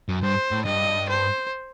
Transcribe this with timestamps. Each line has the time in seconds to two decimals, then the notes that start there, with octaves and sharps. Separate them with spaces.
0.09 F#2
0.23 G2 C5
0.52 A2
0.65 G2 D#5
1.10 C5